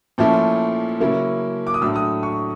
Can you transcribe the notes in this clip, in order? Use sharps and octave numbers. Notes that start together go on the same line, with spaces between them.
A#2 F3 A3 C#4 E4
C#3 F#3 A#3 C#4 E4
D6
D#6
A2 F#3 A3 D4 E6
D#6
C#6